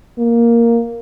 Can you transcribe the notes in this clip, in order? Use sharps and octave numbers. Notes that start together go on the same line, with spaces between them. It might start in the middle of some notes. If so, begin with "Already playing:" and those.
A#3